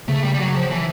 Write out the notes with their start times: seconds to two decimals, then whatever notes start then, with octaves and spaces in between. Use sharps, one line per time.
0.08 C#3 A3
0.24 G3
0.34 G3
0.39 F#3
0.55 F3
0.70 E3